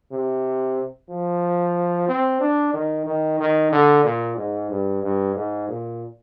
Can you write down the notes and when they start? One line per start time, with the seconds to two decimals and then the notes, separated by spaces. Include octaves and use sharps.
0.12 C3
1.10 F3
2.08 C4
2.41 D4
2.74 D#3
3.06 D#3
3.40 D#3
3.72 D3
4.05 A#2
4.37 G#2
4.70 G2
5.03 G2
5.36 G#2
5.69 A#2